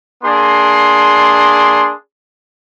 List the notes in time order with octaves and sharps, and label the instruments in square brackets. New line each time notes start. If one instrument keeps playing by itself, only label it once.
[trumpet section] A#3 D4 G#4 C6